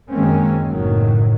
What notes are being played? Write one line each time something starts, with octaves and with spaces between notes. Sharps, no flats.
F#2 D#3 G#3 A#3 C4 C#4
F#1 A2 D#3 F#3